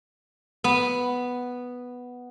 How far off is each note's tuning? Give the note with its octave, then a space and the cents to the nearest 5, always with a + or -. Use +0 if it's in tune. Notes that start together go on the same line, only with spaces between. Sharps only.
B3 +0